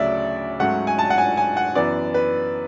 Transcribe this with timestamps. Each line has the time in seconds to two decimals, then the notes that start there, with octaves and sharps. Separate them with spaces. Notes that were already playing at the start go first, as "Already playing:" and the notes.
Already playing: D2 C#3 F#3 A3 C#4 D5 E5
0.59 G#2 F#3 A3 C#4 F#5
0.87 G#5
0.99 A5
1.10 F#5
1.18 G#5
1.37 G#5
1.57 F#5
1.75 F#2 E3 B3 D5
2.14 B4